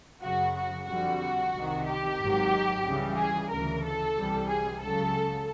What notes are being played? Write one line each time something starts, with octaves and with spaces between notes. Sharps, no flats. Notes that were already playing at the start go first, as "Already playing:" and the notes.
F#2 C#3 F#3 F#4
F#4
F2 D3 G3 F#4
C2 C3 D#3
G4
G#1 G#2 D#3 F#3
C#2 C#3 E3 G3
G#4
D2 C#3 E3 A#4
A4
C2 C3 E3 G3
G#4
C#2 C#3 F#3 A4